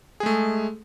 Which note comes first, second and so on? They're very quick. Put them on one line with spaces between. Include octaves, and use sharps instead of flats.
G#4 G#3 A3